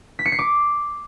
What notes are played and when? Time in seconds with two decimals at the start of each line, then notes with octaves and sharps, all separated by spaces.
0.19 B6
0.25 C#7
0.32 C7
0.39 D6